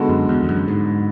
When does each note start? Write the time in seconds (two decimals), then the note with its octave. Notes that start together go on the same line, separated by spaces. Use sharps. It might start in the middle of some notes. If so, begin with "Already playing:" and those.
Already playing: D3 G#3 B3 F#4 A4
0.09 F#2
0.29 E2
0.43 E2
0.49 F#2
0.68 G#2